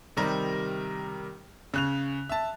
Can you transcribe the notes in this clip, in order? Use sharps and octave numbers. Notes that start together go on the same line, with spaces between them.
C3 D#3 G3 A#4
C#3 F#6 F7
E5 A5